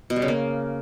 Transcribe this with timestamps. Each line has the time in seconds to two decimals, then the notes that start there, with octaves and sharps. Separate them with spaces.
0.10 B2
0.16 G3
0.22 C#3
0.28 A#3